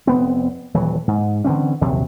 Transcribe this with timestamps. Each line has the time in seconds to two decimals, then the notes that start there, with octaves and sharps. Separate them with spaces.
0.07 F1 B3 C4
0.74 D#1 E3 F#3
1.08 G#2
1.44 D3 E3 C4 C#4
1.81 A#1 D#2 C3 F#3